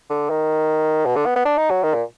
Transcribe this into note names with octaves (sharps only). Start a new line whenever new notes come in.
D3
D#3
B2
D3
B3
B3
D4
D#4
F#3
D#3
A#2